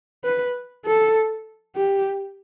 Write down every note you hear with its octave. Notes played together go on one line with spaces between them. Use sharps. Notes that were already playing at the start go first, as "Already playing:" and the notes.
B4
A4
G4